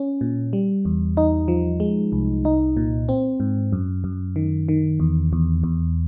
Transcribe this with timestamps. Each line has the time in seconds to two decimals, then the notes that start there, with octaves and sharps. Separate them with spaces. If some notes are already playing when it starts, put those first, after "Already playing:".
Already playing: C#4
0.21 A#2
0.53 G3
0.85 E2
1.17 D#4
1.48 F3
1.80 G#3
2.12 C2
2.45 D#4
2.77 A#2
3.09 C4
3.40 G#2
3.72 F#2
4.04 F#2
4.36 D#3
4.68 D#3
5.00 E2
5.33 E2
5.64 E2